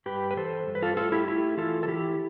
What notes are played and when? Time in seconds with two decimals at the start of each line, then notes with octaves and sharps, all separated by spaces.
0.06 G2 G4 B4
0.31 B4
0.37 E3 A4 C5
0.67 G2
0.75 B4
0.82 F4 A4
0.97 A3 F4 A4
1.12 E4 G4
1.28 A3 E4 G4
1.57 E3 F4 A4
1.83 A4
1.88 E3 E4 G4